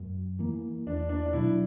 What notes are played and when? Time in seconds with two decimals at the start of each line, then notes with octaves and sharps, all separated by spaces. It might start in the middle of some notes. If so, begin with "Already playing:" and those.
Already playing: F#2
0.39 E3 A#3
0.86 E2 D4
1.09 D4
1.26 D4
1.33 B2 F#3 E4